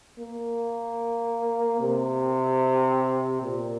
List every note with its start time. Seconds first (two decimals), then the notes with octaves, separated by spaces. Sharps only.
0.18 A#3
1.80 C3
3.42 A#2